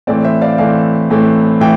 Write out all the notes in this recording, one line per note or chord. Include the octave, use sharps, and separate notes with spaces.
A2 E3 A3 C4 D5
C5 E5
D5 F5
A2 E3 A3 C4 D5 F5
A2 E3 A3 C4
A2 E3 E5 G5